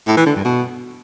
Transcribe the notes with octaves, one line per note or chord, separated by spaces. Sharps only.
A2
E3
D3
G2
B2